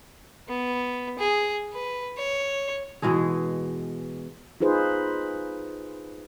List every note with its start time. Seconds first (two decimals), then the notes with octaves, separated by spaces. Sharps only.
0.48 B3
1.19 G#4
1.73 B4
2.18 C#5
3.02 B2 E3 G#3 G#4
4.60 D#4 F4 G#4 B4 C5